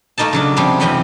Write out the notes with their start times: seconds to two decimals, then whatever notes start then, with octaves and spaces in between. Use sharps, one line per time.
0.18 A3 A#3 D#4 D#5 A5
0.33 C#3 F#3 D4
0.56 C3 F3 G3 G#3
0.80 F#2 C3 E3 D#5 F#5 B5